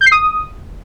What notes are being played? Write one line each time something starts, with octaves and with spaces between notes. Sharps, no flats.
G6
C7
D#6